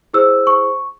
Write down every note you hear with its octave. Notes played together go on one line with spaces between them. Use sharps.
E4 G#4 C5 E6
C#6